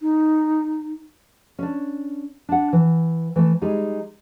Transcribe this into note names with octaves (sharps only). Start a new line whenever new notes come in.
D#4
C#4 D4
D4 F#5
E3
E3 A3
G3 G#3 D#4 G#4